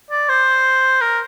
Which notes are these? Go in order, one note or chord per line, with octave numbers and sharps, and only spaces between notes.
D5
C5
A#4